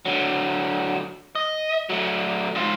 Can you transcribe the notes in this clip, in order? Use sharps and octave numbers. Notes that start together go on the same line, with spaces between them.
D3 F#3
D#5
F#3 A3
G#2 F4